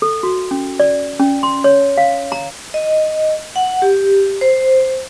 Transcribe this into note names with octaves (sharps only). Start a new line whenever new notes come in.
A4
F#4
C#4
D5
C#4
C6
C#5
F5
A#5
D#5
F#5
G4
C5